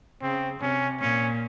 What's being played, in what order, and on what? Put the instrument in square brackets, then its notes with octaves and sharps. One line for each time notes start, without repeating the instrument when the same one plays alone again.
[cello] C#3 [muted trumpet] C4
[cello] C3 [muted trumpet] C#4
[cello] A#2 [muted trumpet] C#4